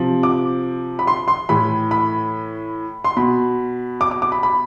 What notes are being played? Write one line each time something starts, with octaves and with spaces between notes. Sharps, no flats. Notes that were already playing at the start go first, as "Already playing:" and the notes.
Already playing: C3 F3
D6
B5
C6
C6
A2 E3 B5
B5
C6
B2 B5
D6
D6
D6
B5
B5